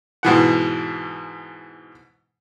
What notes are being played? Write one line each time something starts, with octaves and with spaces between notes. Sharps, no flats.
G#2 B2 E3 F#5